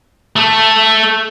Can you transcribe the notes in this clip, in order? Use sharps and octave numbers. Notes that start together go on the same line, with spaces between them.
A3